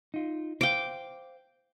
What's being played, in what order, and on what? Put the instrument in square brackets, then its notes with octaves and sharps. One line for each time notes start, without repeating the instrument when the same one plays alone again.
[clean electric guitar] D#4 F4
[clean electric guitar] C5 F5 [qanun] G5 D6